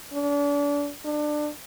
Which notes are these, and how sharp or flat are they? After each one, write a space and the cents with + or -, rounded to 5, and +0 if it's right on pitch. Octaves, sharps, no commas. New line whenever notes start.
D4 -35
D4 +25